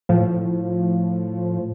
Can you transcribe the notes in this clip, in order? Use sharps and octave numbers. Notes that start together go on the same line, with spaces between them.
A2 F3